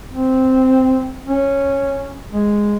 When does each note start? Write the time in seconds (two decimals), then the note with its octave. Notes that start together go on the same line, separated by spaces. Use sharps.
0.13 C4
1.26 C#4
2.33 G#3